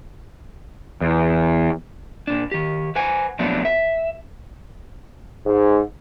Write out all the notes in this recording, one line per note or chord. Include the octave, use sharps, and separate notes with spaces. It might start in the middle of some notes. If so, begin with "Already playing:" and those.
E2
A#2 D4
D#3 G4
B4 C5 F#5 G#5
A#2 F3 F#3 A3 B3 D4
E5
G#2